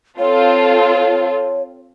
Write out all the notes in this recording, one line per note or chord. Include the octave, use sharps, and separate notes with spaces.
C4 F4 A4 C#5